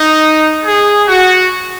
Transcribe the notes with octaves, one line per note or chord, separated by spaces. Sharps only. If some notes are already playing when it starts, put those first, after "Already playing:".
Already playing: D#4
G#4
F#4